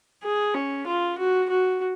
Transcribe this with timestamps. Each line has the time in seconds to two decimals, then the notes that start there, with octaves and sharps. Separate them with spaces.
0.23 G#4
0.54 C#4
0.87 F4
1.18 F#4
1.50 F#4